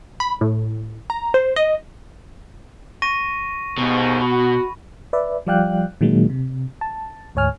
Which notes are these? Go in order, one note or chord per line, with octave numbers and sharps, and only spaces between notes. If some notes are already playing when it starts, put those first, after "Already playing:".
B5
A2
A#5
C5
D#5
C#6 A#6 D#7
D#2 G#2 B2
F#4 B5
B4 D5 E5
F3 G3 D5 F5 G5 F#6
A#2 D#3 F#3 G#3 A#3
C3
A5
D2 G#2 C#5 G#5 F6